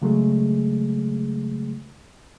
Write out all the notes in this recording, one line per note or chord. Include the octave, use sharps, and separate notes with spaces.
C#3 F#3 G#3 A3 G#4